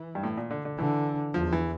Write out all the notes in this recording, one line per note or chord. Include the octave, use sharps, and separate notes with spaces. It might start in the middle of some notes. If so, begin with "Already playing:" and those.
Already playing: E3
G2
A2
A#2
D3
D3
D3 E3
E2 F3
E3